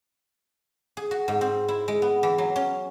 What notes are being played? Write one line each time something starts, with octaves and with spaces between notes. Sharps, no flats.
G#4
F#4
G#2
C4
E4
G#3
B3
E3
F#3
C#4